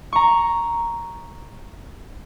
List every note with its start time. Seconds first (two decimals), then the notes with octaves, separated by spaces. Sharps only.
0.13 A#5 C#6